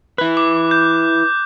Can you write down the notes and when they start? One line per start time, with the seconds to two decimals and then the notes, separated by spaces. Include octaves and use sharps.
0.18 E4 B4 F#6
0.37 D6
0.71 G6